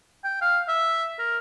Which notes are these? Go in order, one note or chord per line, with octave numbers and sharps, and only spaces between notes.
G5
F5
E5
A#4